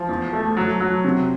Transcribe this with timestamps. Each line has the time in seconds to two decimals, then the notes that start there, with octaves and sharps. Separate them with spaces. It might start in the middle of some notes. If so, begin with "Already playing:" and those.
Already playing: F3
0.09 E2
0.33 A3
0.57 F#3
0.81 F#3
1.04 C3